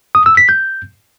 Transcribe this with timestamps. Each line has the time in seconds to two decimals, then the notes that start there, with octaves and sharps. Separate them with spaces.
0.15 D#6
0.26 E6
0.37 B6
0.49 G6